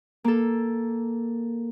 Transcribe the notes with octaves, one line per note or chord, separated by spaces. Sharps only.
A#3 A4